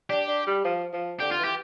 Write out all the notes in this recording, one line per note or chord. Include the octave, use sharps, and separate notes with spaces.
D4 G4
D4
G3
F3
F3
D3 G4
F4
E3
G4